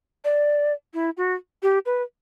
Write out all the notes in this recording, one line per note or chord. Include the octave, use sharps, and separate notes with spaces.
D5
E4
F#4
G4
B4